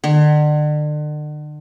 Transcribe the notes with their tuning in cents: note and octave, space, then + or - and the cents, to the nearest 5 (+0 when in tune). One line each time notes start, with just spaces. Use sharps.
D3 +40